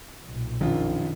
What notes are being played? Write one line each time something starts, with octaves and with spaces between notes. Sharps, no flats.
B1 A#2
A#1 F#2 D#3 F4